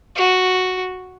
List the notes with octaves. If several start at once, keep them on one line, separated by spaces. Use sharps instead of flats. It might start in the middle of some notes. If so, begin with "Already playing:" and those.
F#4